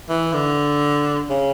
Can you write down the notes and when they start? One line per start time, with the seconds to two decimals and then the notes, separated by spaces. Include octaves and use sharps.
0.09 E3
0.33 D3
1.30 C#3